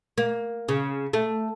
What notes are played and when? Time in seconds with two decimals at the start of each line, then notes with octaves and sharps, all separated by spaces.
0.18 A#3
0.69 C#3
1.13 A3